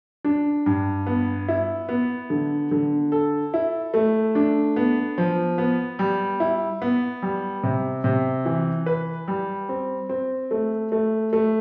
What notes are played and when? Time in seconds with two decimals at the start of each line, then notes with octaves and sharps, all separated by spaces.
0.24 D4
0.66 G2
1.07 B3
1.48 E4
1.89 B3
2.30 D3
2.71 D3
3.12 A4
3.54 E4
3.94 A3
4.35 D4
4.76 B3
5.18 F3
5.58 B3
5.99 G3
6.40 E4
6.82 B3
7.22 G3
7.63 C3
8.04 C3
8.45 E3
8.86 B4
9.28 G3
9.69 C4
10.09 C4
10.51 A3
10.92 A3
11.33 A3